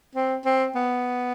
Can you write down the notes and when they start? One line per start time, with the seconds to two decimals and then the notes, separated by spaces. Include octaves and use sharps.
0.15 C4
0.45 C4
0.75 B3